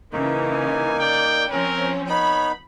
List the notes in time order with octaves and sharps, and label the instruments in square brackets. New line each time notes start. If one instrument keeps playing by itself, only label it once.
[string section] C#3 E3 [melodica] A#3 D#4
[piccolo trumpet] G#5
[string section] D5 [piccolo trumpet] G5
[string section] F3 C4 C#4 [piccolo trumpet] A#4
[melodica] B3 D#4 [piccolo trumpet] C#5 [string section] B5